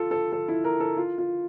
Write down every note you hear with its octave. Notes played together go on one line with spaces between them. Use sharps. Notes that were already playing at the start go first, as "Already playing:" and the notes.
Already playing: F4 A4
A4
A4
E4
A#4
A4
F4
F4